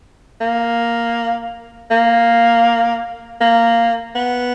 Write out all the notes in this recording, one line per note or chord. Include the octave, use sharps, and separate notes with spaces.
A#3
A#3
A#3
B3